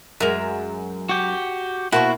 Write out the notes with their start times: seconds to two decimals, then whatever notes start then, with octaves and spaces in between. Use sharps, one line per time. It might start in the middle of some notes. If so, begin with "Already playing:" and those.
0.20 F#2 G#3 A#4 E5
1.09 F#4 G4
1.92 B2 A#3 E4 F#4 C5 C#6